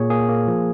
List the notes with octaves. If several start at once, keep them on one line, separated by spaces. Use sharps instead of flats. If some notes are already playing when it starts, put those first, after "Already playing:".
Already playing: A#2 A#3 G#4 C#5
A#3 G#4
A#3
F3